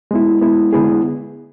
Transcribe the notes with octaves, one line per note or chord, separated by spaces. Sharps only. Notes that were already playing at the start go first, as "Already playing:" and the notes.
G#3 B3 E4
G#3 B3 E4
D3 G#3 B3 E4 G#4